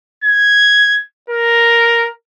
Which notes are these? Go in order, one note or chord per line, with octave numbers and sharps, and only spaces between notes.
G#6
A#4